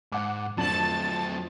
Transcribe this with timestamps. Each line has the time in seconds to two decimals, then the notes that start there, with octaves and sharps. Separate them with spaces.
0.12 G#2 F#5 D6
0.58 F2 F#3 A3 D4 A5 A6 F#7